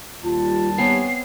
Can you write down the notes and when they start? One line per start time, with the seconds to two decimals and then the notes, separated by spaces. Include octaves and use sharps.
0.24 D#2 G3 F4 A5
0.78 B3 C4 C#5 G#5 C7